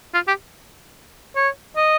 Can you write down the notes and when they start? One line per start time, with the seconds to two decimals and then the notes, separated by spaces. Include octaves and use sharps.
0.14 F4
0.28 G4
1.36 C#5
1.77 D#5